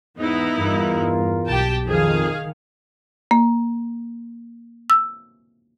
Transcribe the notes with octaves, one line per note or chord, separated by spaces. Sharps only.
E2 G#2 E3 B3 D#4 E4
E2 G2 F4 A#4
B1 G4 G5 A5
F2 D#3 G#4 F5
A#3
E6